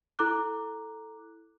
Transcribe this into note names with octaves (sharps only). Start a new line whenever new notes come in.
E4 A4 A#5 D6 F#6